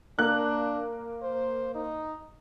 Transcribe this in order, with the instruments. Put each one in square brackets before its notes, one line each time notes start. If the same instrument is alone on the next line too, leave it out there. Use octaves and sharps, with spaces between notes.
[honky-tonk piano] A#3 F#6 [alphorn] D4
[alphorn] C5
D#4